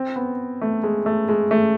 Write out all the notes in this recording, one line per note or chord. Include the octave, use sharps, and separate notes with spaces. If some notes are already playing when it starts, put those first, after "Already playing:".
Already playing: C4
B3
A3
G#3
A3
G#3
A3